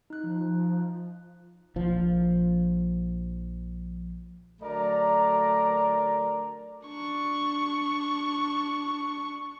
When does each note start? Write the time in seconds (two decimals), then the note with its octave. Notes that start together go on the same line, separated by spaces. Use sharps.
0.10 D#4 F#6
0.24 F3
1.76 A#1 F3
4.61 D3 F#3 A3 A#4 D5 A#5
6.87 D4 C#6